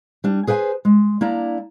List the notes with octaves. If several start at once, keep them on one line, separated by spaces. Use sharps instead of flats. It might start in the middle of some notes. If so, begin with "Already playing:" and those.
G3 D4
G#4 B4 C5 G5 G#5
G#3
A#3 D4 E4 D5 A#5